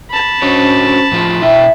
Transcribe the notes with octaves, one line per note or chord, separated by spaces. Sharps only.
A5 B5
C#4 D4 F#4 C5 C#5
A2 F3 F4
B2 E4 E5 G5